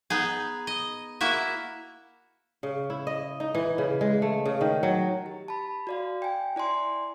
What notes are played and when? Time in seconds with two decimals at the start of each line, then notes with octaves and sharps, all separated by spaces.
0.10 B3 D#4 G#4
0.67 D#5
1.21 A#3 E4 F#4 E5
2.63 C#3
2.90 E4
3.07 D#5
3.40 D#4
3.55 E3
3.78 C#3
4.01 G#3
4.22 A3
4.45 C#3
4.61 D#3
4.83 F#3
5.26 G4
5.48 A5 B5
5.87 F#4 D5 F5
6.22 G5 G#5
6.56 E4 D5 G#5 C6